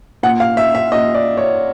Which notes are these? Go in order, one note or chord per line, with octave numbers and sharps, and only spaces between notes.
A#2 F#5
F5
E5
E5
A#2 D#5
D5
C#5